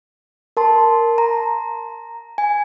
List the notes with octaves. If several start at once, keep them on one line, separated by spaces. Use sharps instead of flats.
A#4 A5 C6
A#5
G#5